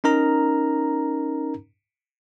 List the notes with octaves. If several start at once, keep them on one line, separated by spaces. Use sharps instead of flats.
C#4 D#4 A#4 A#5